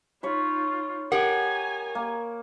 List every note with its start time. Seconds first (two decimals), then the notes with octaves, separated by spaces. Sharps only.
0.23 D#4 F4 C#5 B5
1.12 G4 A#4 F#5 G#5 A#5
1.95 A#3